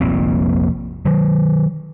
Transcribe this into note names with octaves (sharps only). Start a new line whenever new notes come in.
F1 A#1 A#2 C4
D#3 F#3